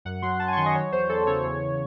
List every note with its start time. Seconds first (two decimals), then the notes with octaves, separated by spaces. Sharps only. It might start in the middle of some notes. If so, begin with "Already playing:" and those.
0.05 F#2 F#5
0.22 F#3 C6
0.40 F#3 A5
0.48 G#5
0.53 C#6
0.57 D#3 C6
0.66 D#5
0.75 F#3 C#5
0.92 E2 C5
1.09 E2 A4
1.27 C#3 C#5
1.44 E2